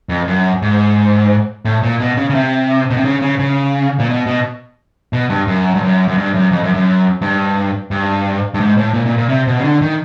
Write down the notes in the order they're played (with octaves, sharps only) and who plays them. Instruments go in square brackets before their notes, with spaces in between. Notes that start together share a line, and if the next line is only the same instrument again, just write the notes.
[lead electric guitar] F2
F#2
G#2
A2
A#2
B2
C#3
C#3
C3
B2
C3
C#3
C#3
C#3
A#2
B2
B2
B2
G2
F#2
G2
F#2
F#2
G2
F#2
F2
F#2
F#2
G2
G2
G2
G#2
A2
A#2
A#2
A#2
C3
B2
C#3
D3
D#3